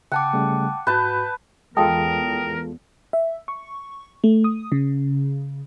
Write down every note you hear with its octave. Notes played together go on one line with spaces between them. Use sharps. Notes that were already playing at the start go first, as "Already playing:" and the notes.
C#3 F#5 G5 A5 D6
C#3 G3 A3
G#2 F#4 B4 A5 G6
E2 G#3 F4 A4 A#4 G5 A5 D#6
E5
C#6
A3
D#6
C#3